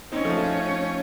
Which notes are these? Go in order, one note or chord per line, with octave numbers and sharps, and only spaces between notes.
C4 C#4 D#4
F3 A3
F3 A3